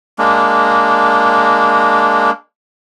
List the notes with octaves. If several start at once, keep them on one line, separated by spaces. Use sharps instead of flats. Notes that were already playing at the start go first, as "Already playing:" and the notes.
G#3 A#3 D4